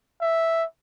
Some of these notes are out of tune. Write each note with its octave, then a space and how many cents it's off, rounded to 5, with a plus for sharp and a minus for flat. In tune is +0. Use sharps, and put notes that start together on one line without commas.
E5 +0